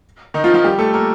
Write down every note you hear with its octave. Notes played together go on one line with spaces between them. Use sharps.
D#3 D#4
F3 F4
F3 F4
G3 G4
A3 A4
A#3 A#4